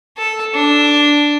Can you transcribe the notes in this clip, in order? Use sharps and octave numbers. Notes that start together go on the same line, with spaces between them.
A4
D4